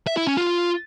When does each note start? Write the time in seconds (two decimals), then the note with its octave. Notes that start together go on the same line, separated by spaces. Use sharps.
0.07 E5
0.17 E4
0.27 C#4
0.37 F4